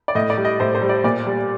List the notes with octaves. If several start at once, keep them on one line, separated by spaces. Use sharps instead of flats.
D5
A2 D#5
D5
G3
D#5
A2 C5
C5
G3
D5
A#2 D5
G3